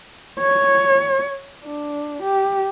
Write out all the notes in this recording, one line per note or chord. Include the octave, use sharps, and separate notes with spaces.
C#5
D4
G4